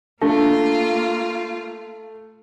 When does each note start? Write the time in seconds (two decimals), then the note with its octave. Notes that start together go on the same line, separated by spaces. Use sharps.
0.22 A3 A#3 D4 F4